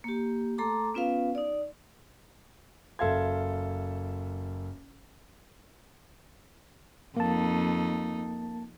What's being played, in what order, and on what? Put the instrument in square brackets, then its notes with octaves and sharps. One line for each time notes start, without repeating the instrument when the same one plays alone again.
[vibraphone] A#3 G4
A3 A4 A#5 C6 D6
B3 C#4 F4 B4 F5
D#4 D5
[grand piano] F#1 A4 E5 F5 C6 G#6
[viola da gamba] F2 D#4 [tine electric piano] A#3 A5